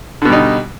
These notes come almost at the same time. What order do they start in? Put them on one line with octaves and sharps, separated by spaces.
D3 B2 G3 D#4